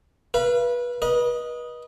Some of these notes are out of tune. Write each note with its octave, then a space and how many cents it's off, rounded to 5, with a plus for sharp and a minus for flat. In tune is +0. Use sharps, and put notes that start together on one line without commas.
B4 -25 F5 -45
B4 -35 D#5 +0